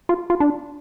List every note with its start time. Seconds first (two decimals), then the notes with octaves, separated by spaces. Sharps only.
0.09 F4
0.30 F4
0.40 D4